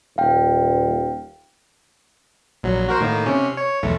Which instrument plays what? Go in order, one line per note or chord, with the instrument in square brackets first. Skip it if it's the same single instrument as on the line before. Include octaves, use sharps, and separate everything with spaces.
[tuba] D#1 [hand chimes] F5 G5
[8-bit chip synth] A#1 F#3
F#4 A#4 C5
A2 D#3 A#3
C3 C#4
C#5
B1 E2 A3